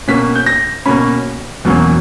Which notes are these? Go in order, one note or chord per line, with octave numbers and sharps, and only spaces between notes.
B2 A#3 C#4 B6
G6
A#6
B2 A#3 C#4 B5
E2 B2 F#3 A#3 C#4